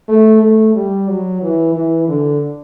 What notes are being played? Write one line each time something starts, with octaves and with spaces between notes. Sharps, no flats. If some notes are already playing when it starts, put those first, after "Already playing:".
A3
A3
G3
F#3
E3
E3
D3